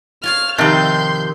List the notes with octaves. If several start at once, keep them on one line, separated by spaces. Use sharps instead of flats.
F4 C#5 F5 F6
F2 C3 D#3 G4 C6 G6